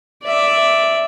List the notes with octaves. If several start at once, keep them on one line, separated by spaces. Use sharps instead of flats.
D5 E5